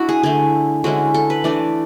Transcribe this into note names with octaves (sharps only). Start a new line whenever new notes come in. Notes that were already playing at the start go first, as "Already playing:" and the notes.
Already playing: D4 E4 F#4
G#4
D3 A3 E4 G#4
D3 G#3 C#4 E4 F#4
A4
B4
E3 A3 D4 D5